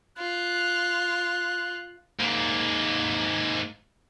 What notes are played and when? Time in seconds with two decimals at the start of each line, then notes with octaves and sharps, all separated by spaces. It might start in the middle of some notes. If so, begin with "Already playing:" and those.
0.18 F4 F#6
2.19 G#2 A#3